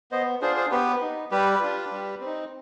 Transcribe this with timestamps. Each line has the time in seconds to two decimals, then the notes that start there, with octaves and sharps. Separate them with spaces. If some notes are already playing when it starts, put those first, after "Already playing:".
0.11 B3 C5 D#5
0.41 D4 F4 G#4 C5
0.56 G#4 C5
0.71 B3 G4 B4
1.01 D#4
1.31 G3 G4 B4
1.61 D4 F4
1.91 G3
2.21 C4 D#4